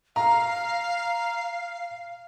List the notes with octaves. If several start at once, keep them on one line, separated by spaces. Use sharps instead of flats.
F5 A#5